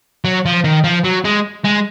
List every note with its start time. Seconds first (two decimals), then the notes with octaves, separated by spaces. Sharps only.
0.24 F#3
0.45 F3
0.64 D#3
0.84 F3
1.04 F#3
1.24 G#3
1.64 G#3